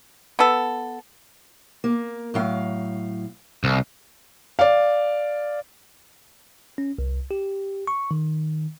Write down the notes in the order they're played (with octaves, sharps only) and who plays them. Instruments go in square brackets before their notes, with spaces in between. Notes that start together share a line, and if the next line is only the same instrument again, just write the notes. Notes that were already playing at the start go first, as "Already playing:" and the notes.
[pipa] B3 A4
[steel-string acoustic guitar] A#3
A2 F#3 F5
[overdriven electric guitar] C2
[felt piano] D5 F5
[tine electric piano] C#4
C2
G4
C#6
D#3